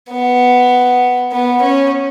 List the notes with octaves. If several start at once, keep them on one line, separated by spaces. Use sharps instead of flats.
B3
B3
C#4